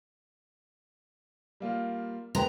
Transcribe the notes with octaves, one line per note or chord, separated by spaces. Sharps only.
G3 A#3 F4
G#3 B4 G5 A#5